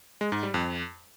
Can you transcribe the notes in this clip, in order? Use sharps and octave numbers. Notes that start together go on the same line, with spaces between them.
G#3
G#2
G3
F2